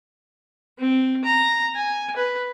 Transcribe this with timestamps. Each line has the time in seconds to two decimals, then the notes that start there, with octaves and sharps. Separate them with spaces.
0.79 C4
1.24 A#5
1.75 G#5
2.16 B4